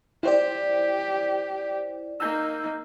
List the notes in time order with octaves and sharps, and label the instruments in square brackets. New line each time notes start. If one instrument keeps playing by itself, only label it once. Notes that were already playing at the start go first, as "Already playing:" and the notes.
[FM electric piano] E4 C5 D5 [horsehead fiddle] G4
[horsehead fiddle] A#3 D#4 [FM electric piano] E6 G6